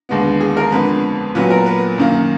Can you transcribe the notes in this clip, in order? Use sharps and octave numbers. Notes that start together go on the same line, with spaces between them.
D#2 D3 G#3 B3
G#4
A#4
F2 D3 G#3 B3 B4
A#2 F#3 B3 B4
A#4
B4
F#2 D#3 A#3